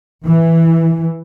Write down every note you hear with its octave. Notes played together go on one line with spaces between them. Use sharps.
E3